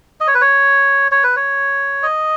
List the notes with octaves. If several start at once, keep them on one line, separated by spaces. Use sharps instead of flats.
D#5
C#5
B4
C#5
C#5
B4
C#5
D#5